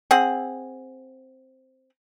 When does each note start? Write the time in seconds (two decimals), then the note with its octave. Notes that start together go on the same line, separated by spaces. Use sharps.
0.11 C4 G#4 F#5